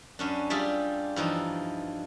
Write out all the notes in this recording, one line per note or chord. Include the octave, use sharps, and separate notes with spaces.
F#2 C#4 D4
G3 F4 G4 G#4 D5 E5
G2 E3 F3 D#4